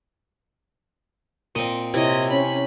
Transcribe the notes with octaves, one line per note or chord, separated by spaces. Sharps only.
A#2 C4 D#5
C3 E4 C#5 D#5
C#4 B5